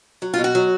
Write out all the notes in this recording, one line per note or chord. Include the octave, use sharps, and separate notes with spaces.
F#3
B2 F4
F#4
F#3